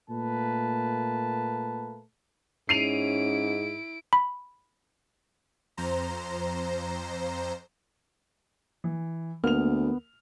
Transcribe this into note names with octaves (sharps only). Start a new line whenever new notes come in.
A#2 A3 A#3 B4 A5
G#2 C#4 E4 C7 D7 D#7 F7
B5
F2 C5 A#5
E3
D2 A#3 B3 F6 F7